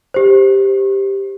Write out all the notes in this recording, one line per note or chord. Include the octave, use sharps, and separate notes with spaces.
G4 C5